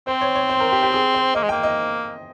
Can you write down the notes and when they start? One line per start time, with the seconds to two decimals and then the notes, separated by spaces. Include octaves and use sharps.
0.07 C4 C5
0.21 C#5
0.35 C#5
0.49 C5
0.60 A#4
0.72 G4
0.83 G4
0.93 G#4
1.14 C5
1.35 A#3 D#5
1.43 G#3
1.49 A#3 G5
1.63 D#5